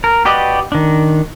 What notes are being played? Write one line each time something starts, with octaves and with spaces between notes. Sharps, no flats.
A#4
F#4 G4 B4 D5 D#5
D#3 D4